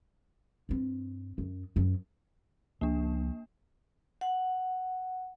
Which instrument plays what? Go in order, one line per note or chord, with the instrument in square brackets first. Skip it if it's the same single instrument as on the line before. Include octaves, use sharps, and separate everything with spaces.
[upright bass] G2 C4
F#2
F#2 F3
[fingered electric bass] C#2 F3 [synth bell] A#3 D4
[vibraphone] F#5